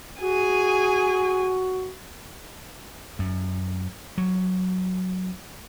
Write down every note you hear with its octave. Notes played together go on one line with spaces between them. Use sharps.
F#4 G#4 G#5
F#2
F#3